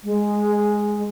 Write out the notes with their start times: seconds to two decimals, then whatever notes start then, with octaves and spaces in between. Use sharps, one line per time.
0.04 G#3